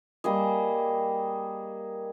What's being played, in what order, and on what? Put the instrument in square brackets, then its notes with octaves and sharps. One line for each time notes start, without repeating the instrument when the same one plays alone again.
[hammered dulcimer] G3 A#3 G#4 D#5